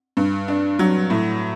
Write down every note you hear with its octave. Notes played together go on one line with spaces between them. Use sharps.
G2
D4
F#3
A2